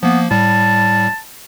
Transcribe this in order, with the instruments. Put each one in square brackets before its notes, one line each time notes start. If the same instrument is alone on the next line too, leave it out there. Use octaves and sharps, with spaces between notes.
[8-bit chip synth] F3 A#3 [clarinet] B3
[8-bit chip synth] A2 G3 [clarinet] A5